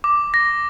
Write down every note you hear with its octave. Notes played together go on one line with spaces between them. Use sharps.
D6
A#6